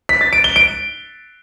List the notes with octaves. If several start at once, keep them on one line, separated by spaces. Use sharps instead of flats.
B6
A6
D7
G7
D7